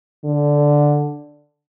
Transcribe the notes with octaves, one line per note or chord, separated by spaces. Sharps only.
D3